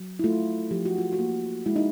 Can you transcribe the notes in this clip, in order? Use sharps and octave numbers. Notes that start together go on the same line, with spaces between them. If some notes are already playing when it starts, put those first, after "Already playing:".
Already playing: F#3
E4
A3 F4
F3 G4
F#4
F4
F#4
A#3
G#3 E4
D#4